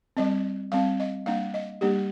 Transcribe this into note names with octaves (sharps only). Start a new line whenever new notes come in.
G3 C4 D#5
G3 C4 F5
D#5
G3 A#3 D4 F5
D#5
G3 A#3 D4 G4